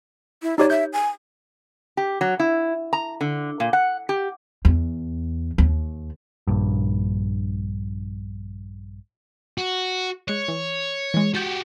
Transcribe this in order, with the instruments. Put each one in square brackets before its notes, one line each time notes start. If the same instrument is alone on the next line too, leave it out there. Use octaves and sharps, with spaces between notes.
[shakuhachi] E4
[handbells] D#4 G4 C#5 [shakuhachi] D5
[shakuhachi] E5 [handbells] G6
[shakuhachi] G#5
[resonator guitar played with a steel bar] G4
F#3
E4
A#5
D3
A#2
F#5
G4
[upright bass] E2
D#2
[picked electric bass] A#1 G2
[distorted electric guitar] F#4
[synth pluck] G#3 F#6 [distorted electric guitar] C#5
[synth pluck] E3
E3 G#3
[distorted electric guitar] F#4 G4 [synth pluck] G6 A6 C#7